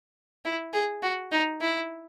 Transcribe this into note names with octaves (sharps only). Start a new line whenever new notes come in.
E4
G#4
F#4
D#4
E4